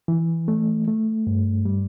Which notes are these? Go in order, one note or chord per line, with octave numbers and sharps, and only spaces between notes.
E3
A3
A3
G2
G3